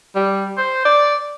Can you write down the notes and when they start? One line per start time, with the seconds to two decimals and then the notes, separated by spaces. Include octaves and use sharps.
0.15 G3
0.57 C5
0.85 D5